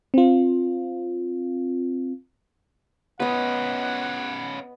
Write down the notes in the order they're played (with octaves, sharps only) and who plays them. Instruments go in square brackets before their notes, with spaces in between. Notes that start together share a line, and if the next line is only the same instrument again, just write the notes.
[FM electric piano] C4 F4
[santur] B3 D#5 [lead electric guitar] C#4 B4 [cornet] F#5